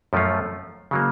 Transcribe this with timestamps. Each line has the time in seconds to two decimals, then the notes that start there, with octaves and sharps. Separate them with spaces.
0.13 F#2 F3 A3 C#4 F4
0.91 C#3 F#3 A#3